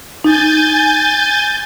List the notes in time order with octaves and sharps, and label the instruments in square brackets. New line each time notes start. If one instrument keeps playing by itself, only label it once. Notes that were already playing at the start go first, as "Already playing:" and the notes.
[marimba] D#4 [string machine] G#5 G6 A6